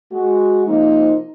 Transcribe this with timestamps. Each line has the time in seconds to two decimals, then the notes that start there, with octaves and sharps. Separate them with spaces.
0.12 G#3 F#4
0.67 C3 F3 A#3 C4 D#4